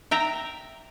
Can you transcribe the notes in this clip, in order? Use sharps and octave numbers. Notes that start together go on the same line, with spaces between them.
E5 G5 A#5